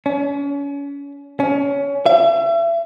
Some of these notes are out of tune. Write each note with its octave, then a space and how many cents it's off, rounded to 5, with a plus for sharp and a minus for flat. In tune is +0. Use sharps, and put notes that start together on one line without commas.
C#4 +35
C#4 +20
E5 +35